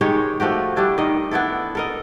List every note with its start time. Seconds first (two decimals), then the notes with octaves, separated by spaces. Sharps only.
0.01 D#3 G#3 G4 C#5
0.40 F3 A3 F#4 G4
0.76 G3 A3 D4 E4
0.98 D#3 D#5
1.31 B3 D4 E4 A4
1.75 A4 A#4 D#5